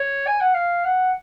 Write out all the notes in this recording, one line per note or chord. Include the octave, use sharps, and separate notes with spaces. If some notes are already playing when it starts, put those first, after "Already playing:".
Already playing: C#5
G#5
F#5
F5
F#5